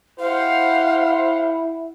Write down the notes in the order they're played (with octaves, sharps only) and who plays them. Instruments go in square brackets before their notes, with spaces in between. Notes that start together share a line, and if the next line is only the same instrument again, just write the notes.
[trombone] E4 [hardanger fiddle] G4 F#5 [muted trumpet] C5 [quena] F5